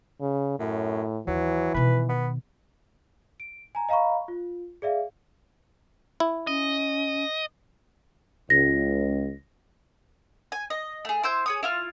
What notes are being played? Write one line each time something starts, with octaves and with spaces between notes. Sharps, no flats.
C#3
F#2 A2
D#2 E3 F#3
B2 D#3 B4
B3
D7
G#5 A#5
D#5 F5 A#5 B5 C#6
F4
G#4 D5 E5 F5
E4
C#4 D#5
C#2 A#6
G#5
D#5
A3 G#4
E4 C5 E6 G6
G#4 C#5 D#6
E4 F4 F6